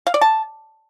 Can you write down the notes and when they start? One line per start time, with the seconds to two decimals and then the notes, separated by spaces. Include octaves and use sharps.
0.07 F5
0.14 D5
0.21 A5